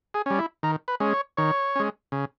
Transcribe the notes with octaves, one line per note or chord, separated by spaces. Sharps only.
G#4
G3 C#4
E4
D#3 A#4
B4
G#3 C#4
C#5
D#3 C#5
G#3 C#4
C#3